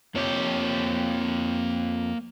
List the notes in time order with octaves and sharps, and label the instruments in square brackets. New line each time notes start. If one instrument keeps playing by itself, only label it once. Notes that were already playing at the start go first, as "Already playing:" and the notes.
[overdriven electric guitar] F2 G4 [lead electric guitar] A#3 C#5